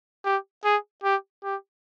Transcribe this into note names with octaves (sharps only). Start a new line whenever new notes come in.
G4
G#4
G4
G4